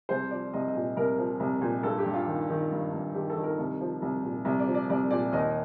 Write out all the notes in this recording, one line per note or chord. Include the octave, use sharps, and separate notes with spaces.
C2 C5
F3 D5
C2 D#5
D#5
A#2
C2 A#4
F3
C2
A#2
G2 A4
G4
G2
F4
D#3
D#3
G2
G2
D#3 G4
A4
D#3
A#4
C2
F3
C2
A#2
C2
D5
F3
D5
C2 D5
A#2 D5
D#2 D#5